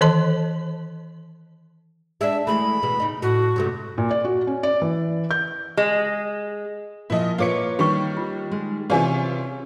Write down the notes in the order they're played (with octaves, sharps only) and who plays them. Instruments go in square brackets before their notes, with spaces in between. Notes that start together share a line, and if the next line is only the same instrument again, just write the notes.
[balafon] D#3 E3 A4 D#5 A5
[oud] G#3 D4 [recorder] E5
[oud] E3 G#3 A3 [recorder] B5
[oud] B2 E3 G#3
C#3 D#4
[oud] A2 [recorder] F#4
[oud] G2 C3 A3
[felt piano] A#2
D5
F#4
C#4
D5
E3
G6
[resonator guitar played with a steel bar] G#3
[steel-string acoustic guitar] A#2 F3 F4 [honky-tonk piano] E4 D#5
[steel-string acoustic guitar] A#3 B4 C#5 [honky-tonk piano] F4 D6 C#7
[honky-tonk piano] D#3 G3 [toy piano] G4 C#6
[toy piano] F4
[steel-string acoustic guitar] G#3
[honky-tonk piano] C3 E3 F4 [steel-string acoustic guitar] C#4 [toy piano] G#4 D5 G#5